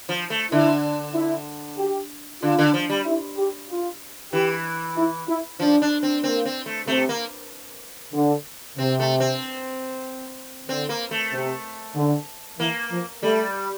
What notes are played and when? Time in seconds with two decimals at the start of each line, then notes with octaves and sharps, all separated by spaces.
0.09 F3
0.30 A3
0.52 D3 E4
1.15 E4
1.78 G4
2.43 D3 F4
2.59 D3
2.74 F3
2.89 G3
3.06 E4
3.37 G4
3.70 F4
4.32 E3 G4
4.97 E4
5.28 E4
5.60 F3 D4
5.82 D4
6.03 C4
6.24 A#3 C4
6.45 C4
6.66 A3
6.87 C3 A3
7.09 A#3
8.14 D3
8.77 C3 C4
9.00 A3
9.20 C4
10.68 D3 C4
10.89 A#3
11.11 A3
11.32 C3
11.95 D3
12.58 E3 A#3
12.91 F3
13.23 G3 A3